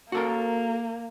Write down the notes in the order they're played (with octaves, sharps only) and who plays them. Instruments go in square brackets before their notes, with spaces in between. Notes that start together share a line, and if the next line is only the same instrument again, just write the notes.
[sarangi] A#3 [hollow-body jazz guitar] F#4 A4 A#4